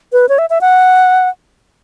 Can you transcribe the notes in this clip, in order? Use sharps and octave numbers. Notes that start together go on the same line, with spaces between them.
B4
C#5
E5
E5
F#5